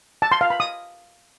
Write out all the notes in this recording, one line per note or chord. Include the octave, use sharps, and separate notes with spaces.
A5
C6
F5
B5
D#6